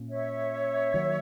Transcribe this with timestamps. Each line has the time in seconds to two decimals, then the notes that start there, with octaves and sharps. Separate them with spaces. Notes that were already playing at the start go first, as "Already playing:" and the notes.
Already playing: A#2 A#3 C#4
0.09 C#5 E5
0.94 D#3 F#3 A#3